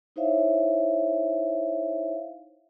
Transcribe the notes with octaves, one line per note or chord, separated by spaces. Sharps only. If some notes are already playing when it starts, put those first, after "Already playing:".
D#4 E4 C5 C#5 E5 F5